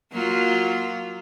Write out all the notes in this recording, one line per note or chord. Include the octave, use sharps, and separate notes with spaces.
F#3 A#3 F4